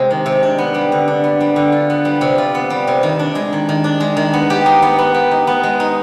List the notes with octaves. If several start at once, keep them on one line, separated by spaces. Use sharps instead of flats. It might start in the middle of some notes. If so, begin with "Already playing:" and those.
Already playing: C3 G#3
D#3
C3
D4
B3
G3
D3
D4
B3
G3
D3
F4
B3
G3
C3
F4
B3
G3
C3
D#3
D4
G#3
D#3
D#3
D4
G#3
D#3
B3
G4
D#4
B3
B3
G4
D#4
B3
G#3
D#4